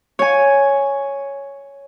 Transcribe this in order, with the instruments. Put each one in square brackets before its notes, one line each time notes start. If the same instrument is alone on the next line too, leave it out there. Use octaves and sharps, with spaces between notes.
[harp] C#5 G#5